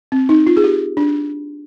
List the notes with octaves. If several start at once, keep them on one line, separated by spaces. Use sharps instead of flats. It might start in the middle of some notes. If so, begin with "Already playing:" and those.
C4
D#4
F4
G#4
G4
D4